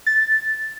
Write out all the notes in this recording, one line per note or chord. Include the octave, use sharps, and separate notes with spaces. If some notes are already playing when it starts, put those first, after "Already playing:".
A6